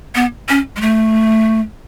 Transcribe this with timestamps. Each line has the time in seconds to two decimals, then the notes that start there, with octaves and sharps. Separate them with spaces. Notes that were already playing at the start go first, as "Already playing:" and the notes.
0.15 B3
0.49 C#4
0.76 G#3
0.81 A3